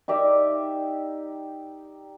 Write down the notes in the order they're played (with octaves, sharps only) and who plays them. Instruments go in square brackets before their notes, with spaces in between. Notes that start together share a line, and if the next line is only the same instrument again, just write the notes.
[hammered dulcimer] D#4 G4 D5 E5